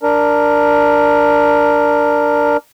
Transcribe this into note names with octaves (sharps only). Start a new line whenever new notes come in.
D4 A#4